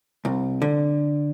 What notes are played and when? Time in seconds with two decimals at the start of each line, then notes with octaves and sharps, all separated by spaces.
0.25 C2
0.62 D3